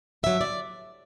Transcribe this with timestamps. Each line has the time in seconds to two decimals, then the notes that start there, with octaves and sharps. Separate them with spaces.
0.23 G2 D3 F#3 E5
0.41 D5